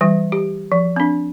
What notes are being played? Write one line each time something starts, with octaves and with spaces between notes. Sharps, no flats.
E3 G3
G4
F3
C4 D4